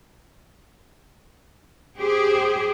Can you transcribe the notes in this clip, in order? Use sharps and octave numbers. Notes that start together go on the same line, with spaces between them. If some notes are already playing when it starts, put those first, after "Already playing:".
G4 G#4 C5